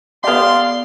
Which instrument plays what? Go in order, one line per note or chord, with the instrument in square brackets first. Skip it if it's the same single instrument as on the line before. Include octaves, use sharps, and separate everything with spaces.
[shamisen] B3 G4 [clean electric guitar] D5 F5 [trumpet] C6